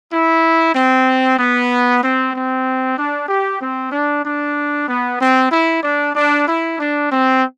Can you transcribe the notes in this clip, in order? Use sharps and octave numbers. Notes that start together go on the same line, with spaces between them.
E4
C4
B3
C4
C4
D4
G4
C4
D4
D4
B3
C4
E4
D4
D4
E4
D4
C4